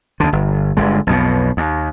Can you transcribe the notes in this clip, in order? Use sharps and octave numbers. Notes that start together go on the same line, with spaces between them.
D2 D3
G1
G1 D3 G#3
B1 F2 B2
D#2